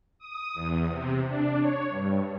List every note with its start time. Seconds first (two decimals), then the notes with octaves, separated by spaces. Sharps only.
0.19 D#6
0.54 E2
0.89 C3
1.26 D4
1.59 C#5
1.89 G2